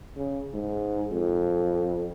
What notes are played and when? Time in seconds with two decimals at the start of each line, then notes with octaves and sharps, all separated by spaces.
0.17 C#3
0.54 G#2
1.12 F2